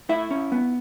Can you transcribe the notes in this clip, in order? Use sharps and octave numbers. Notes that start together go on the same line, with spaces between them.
A3 E4 E5
C#4
B3